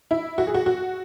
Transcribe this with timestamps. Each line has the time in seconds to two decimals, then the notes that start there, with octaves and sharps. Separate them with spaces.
0.11 E4
0.38 F#4
0.47 G#4
0.54 F#4
0.66 F#4